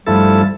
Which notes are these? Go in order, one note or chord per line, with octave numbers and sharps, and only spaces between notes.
G2 F3 G3 A3 E4 A4